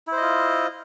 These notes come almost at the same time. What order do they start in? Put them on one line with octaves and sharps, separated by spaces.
E4 C5 D#5 F4